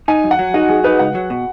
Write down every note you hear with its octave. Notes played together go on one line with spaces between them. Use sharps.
D#4 G#5
F#2
F#5
F#3
D#4 F#4
F#2 G#4
D#4 B4
C#2 F#5
F#3
B2